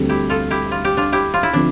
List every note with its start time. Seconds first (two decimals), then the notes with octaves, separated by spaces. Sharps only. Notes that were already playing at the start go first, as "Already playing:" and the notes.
Already playing: D2 D3 G3 C4 A4
0.09 E4 G4
0.30 F4 A4
0.51 E4 G4
0.71 F4
0.85 G4
0.97 D4 F4
1.12 E4 G4
1.34 F4
1.43 E4
1.53 D3 F3 C4 D4